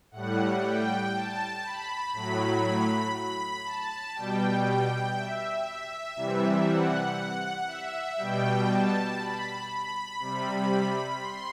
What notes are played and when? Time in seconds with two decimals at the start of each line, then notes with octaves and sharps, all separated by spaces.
0.11 A2 G3 F#5
0.62 G5
1.13 A5
1.63 B5
2.13 A2 F#3 B5
3.14 B5
3.64 A5
4.15 B2 G3 G5
5.16 E5
6.16 C3 E3 G3
6.67 F#5
7.67 E5
8.17 B2 G3 G5
8.67 A5
9.18 B5
9.68 B5
10.20 C3 G3
11.20 C6